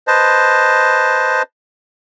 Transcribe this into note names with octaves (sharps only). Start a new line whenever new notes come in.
B4 C5 D#5 A5